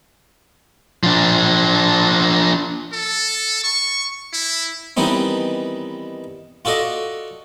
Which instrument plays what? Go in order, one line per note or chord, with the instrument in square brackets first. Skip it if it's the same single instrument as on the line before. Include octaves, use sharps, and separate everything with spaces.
[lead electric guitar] F3 D4
[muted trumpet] A4
C#6
E4
[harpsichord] D#3 E3 G3 B3 C4 D#4
F4 F#4 A4 D5 D#5